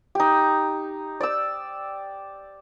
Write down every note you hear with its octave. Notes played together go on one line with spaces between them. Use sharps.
D#4 G4
D5 E6